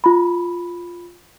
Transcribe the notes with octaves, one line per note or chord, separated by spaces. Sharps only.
F4 B5